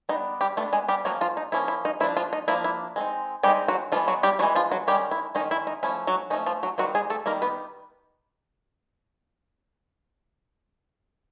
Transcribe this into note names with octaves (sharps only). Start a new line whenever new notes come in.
G3 B3 D4 D#4
G3 G4
G3 A3 B3 D4 A4
G#3 G#4
G3 G4
F3 F#3 A#3 C#4 F#4
F3 F4
D#4
F3 A#3 C#4 E4
E4
D#4
F3 A#3 D4 E4
F3 F4
D#4
F3 A#3 D4 E4
E4
G#3 C4 D#4
G3 G#3 C4 D#4 G4
F#3 F#4
E3 F3 G#3 B3 F4
F#3 F#4
G3 G4
E3 F#3 G#3 B3 F#4
F3 F4
F#3 F#4
D#3 G3 G#3 C#4 G4
E4
D#3 G#3 C#4 D#4
E4
D#4
F3 A3 C#4 E4
F#3 F#4
F3 A3 C#4 D#4
F3 F4
F#3 F#4
D#3 F#3 G3 C4 D#4 F#4
G#3 G#4
A3 A4
D#3 G3 A#3 D#4 A#4
B3 B4